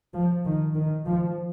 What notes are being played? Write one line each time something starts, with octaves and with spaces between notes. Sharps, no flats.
F3
D#3
D#3
F3